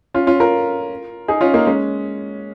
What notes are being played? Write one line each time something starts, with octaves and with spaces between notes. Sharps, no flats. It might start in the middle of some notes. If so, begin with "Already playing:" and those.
C#4 F4
C#4 F4
F4 A#4
D#4 G#4
C#4 F4
A#3 D#4
G#3 C#4